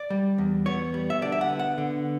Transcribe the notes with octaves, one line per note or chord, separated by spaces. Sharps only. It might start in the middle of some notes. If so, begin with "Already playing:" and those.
Already playing: D5
G3
E2
B3 C#5
G3
E5
D3 D5
E5
F#5
B3
F#5
D3